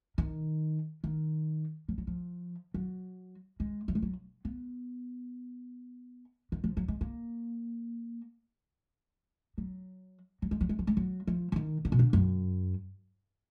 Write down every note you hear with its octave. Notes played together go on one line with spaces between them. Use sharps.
D#3
D#3
F3
F#3
F3
F#3
G#3
F#3
G#3
F#3
B3
D#3
F3
F#3
G#3
A#3
F#3
F#3
G#3
F#3
G#3
F#3
G#3
F#3
F3
F3
D#3
D3
B2
D3
F#2